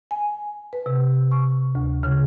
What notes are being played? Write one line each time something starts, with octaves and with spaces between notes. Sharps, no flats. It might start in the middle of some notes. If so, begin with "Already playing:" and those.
G#5
B4
C3
C#6
D2
C#3